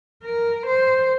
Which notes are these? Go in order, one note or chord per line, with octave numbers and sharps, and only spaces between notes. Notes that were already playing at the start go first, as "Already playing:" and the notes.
A#4
C5